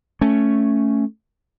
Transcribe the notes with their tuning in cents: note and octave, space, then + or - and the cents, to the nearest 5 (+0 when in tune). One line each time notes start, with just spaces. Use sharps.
A3 +0 C#4 +0